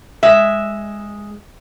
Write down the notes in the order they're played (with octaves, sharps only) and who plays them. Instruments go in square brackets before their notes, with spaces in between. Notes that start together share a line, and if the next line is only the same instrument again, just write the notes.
[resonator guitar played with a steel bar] G#3 E5